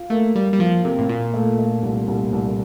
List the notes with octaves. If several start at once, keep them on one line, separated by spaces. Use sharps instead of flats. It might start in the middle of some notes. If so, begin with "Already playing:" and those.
Already playing: F4
A3 A#3
G3 A#3
G3
F3 F4
C3 A#3
A2
A#2 F4
A3
A3
C2
C2
C2